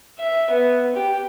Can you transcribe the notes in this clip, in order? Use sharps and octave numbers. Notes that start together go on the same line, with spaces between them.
E5
B3
G4